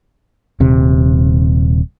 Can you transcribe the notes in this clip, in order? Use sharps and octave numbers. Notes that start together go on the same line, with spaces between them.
D#1 C3